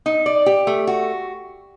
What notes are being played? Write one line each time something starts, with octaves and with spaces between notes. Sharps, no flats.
D#4
D5
G4
A3
F#4